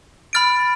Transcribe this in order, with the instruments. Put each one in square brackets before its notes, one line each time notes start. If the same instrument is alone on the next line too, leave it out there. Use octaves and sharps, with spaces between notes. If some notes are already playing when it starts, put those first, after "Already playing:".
[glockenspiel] B5 F6 A6 D7